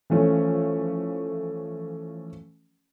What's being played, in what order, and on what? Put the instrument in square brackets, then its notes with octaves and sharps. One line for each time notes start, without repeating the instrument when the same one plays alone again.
[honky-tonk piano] E3 F3 A3 C#4